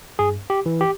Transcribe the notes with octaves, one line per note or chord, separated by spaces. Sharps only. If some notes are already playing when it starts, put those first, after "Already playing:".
G2 G#4
G4
E3
G4